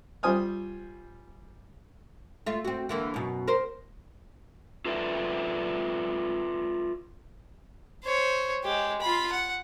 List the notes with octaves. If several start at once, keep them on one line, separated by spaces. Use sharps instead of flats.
G3 F4 C5 G#5 D#6 F6
A3 F4
C4 F#4
D3 E3 A#3
F#2 B2
A#4 C5
F4 A4 B4 D5 E5
C5 C#5
G#3 G4
F4 B5
F#5